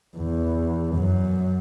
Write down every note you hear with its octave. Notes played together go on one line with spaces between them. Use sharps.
E2
F#2